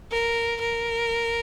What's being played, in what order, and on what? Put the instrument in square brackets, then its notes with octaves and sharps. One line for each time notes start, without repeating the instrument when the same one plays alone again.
[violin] A#4
A#4